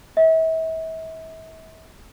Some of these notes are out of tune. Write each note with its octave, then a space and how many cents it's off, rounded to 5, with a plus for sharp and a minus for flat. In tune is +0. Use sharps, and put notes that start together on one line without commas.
E5 -40